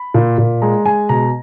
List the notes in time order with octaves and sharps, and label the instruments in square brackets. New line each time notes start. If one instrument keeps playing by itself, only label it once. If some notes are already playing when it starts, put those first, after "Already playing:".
Already playing: [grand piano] B5
A#2
A#2
G#3 A#5
G#3 G#5
B2 A#5